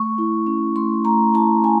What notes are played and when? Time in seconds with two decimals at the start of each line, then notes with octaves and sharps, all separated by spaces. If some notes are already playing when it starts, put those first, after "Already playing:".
Already playing: A3 C#6
0.18 E4
0.47 C#4
0.76 A3 C6
1.05 A3 A#5
1.34 E4 A5
1.63 C#4 G#5